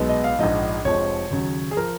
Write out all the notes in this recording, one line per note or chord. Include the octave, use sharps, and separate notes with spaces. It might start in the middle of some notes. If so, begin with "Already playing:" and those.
Already playing: B1 B2 G#3 B3
D#5
F5
A#1 G#2 F3 D#5
F1 F2 F3 G#3 C#5
D#2 C#3 F#3
G#4
F3 A#4